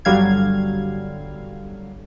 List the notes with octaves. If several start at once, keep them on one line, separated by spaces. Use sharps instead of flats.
G1 D3 F#3 G3 F5 G#6